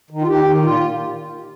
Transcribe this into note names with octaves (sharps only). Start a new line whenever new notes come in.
D#3
F4
D#3 G4
D#3
A#2 F4